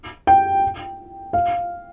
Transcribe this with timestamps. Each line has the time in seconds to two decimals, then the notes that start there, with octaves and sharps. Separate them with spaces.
0.27 G5
1.33 F5